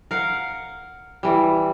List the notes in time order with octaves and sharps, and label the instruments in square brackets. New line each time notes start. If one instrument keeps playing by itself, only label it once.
[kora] A#4 F5 F#5
E3 G3